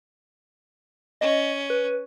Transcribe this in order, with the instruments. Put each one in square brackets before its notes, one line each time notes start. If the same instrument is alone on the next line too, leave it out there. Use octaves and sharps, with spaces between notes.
[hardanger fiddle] C#4 [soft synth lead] D#5
[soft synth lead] B4